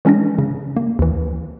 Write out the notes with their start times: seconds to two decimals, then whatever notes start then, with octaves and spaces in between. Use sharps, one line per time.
0.05 E3 G#3 C#4 D4 A#6
0.38 C#3
0.77 A#3
0.99 D#2 E3